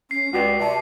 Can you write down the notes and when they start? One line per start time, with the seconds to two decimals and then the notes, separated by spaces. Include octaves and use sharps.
0.11 C#4 C7
0.33 C#2 F#4 G4 B4 D5
0.60 C3 D5 A5